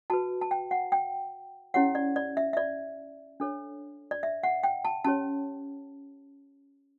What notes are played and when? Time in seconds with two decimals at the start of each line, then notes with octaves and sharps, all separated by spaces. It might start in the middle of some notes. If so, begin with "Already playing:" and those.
0.10 F#4 B4 A5
0.41 A5
0.51 G5
0.71 F#5
0.92 G5
1.74 C#4 E4 G4 C#5 F#5
1.95 D5
2.16 D5
2.37 E5
2.53 E5
2.57 D5
3.40 D4 A4 C#5
4.11 D5
4.23 E5
4.43 F#5
4.63 G5
4.85 A5
5.04 C#4 G4 C#5 A5